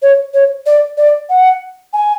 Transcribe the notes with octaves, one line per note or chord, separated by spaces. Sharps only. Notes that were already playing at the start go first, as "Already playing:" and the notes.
C#5
C#5
D5
D5
F#5
G#5